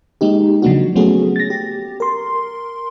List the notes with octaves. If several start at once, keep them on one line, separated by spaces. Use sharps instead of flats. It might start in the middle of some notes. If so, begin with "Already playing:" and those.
G#3 A#3 D#4 G4
C#3 F3 F#3 A#3 D4 F#4
F#3 A3 B3 C#4 F#4 G#4
A6 A#6
G4
A#4 C6